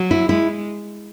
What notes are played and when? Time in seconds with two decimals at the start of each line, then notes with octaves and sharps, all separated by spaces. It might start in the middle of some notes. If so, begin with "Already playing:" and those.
Already playing: F#3
0.11 E4
0.29 G#3 E4